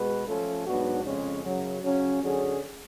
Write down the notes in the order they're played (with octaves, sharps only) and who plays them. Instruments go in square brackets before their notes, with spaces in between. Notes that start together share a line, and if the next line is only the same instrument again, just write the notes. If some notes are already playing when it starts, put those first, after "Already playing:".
Already playing: [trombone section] B2 G#3 F#4 B4
F3 A3 C#4 F4 A4
G#2 F#3 B3 D4 F#4
F2 C#3 G#3 C#4
F#2 C#3 F#3
C#3 F#3 C#4
D3 F#3 C#4 G#4